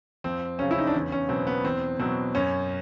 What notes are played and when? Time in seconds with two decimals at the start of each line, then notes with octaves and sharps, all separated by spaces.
0.24 F2 C4
0.59 C#3 F#3 C#4
0.71 E4
0.79 D#4
0.87 D4
0.94 E2 C#4
1.12 C#4
1.29 B2 F#3 C4
1.47 B3
1.64 E2 C4
1.99 B2 F#3 C4
2.35 F#2 C#4